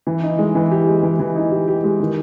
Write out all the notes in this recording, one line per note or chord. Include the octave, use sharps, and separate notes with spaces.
E3
D#4
G#3
E3
G4
G#3
E3
E3
D#4
G4
G4
G#3
D#3